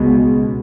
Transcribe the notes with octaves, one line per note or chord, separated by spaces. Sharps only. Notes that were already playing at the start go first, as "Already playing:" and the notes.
Already playing: C#2 B2 G#3